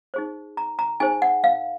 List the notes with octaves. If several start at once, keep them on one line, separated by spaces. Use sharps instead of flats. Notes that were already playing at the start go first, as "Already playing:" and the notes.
D#4 G#4 C5
A#5
A#5
D#4 G#4 C5 G#5
F#5
F5